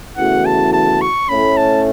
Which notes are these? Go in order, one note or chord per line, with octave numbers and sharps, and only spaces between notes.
E2 C#3 E3 A3 F#4 F#5
A5
A5
C#6
A2 A3 C#4 B5
A5